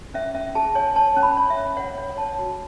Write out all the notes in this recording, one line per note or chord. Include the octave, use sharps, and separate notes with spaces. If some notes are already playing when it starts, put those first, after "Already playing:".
C#4 E5
C#4 E5
G#4 A5
C#5 G#5
C#5 A5
C#4
B5
C#5
E5
C#4
C#5 F#5
C#5
C#5 A5
F#4